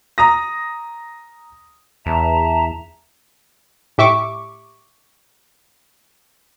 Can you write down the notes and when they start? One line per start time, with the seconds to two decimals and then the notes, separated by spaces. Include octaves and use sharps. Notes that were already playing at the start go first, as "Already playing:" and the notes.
0.18 A#5 D#6 A#6
2.06 E2 E5 A5 A#5
3.98 A2 G4 E5 C#6 D6